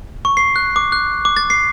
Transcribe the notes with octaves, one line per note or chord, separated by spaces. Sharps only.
C#6
C7
F#6
D6
F#6
D6
A6
C7